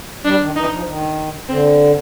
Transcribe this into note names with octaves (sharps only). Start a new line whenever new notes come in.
G3 D4
D#3
E3 D#4
F3
D#3
D3 C4